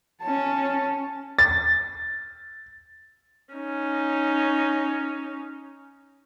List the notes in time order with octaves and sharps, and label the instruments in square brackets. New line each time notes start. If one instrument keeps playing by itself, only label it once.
[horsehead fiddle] C#4 A5
[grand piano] A6
[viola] C#4 D#4